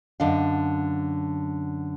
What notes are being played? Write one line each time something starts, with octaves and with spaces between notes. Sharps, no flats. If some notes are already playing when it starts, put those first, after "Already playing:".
F#2 D3 D4 D#5 F5